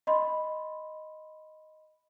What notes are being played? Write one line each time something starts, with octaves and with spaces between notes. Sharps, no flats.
D#5 B5 C6